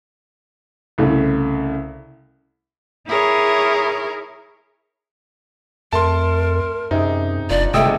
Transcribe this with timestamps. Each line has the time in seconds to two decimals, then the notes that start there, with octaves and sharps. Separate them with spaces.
0.98 C2 C#3 A3
3.07 E4 G#4 A#4 C#5
5.93 F2 A3 A#4 A5 C6
6.91 F#2 C3 D#4 G#4 G5
7.50 F1 F3 D4 D5 D#5
7.74 G1 C3 G#3 A3 E4 G5 D#6 E6